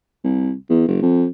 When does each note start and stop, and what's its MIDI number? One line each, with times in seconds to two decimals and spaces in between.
0.24 0.53 36
0.70 0.85 40
0.88 0.99 30
1.03 1.26 41